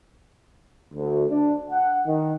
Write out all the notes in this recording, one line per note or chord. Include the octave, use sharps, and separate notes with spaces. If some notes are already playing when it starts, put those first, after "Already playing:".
D2
D4
F#5
D#3